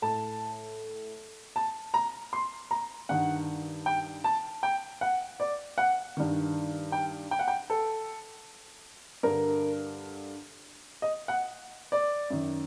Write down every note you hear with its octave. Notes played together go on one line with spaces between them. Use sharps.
A2 A5
A5
A#5
C6
A#5
G2 D#3 F#5
G5
A5
G5
F#5
D5
F#5
G2 D#3
G5
G5
F#5
G5
A4
G2 D3 A#4
D#5
F#5
D5
F#2 D#3